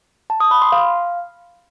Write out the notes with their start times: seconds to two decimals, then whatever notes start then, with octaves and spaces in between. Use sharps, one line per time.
0.30 A5
0.40 D#6
0.51 B5
0.62 C6
0.72 F5